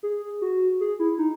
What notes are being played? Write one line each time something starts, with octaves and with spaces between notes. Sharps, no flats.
G#4
F#4
G#4
E4
D#4